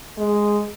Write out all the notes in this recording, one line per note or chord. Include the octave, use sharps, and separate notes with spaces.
G#3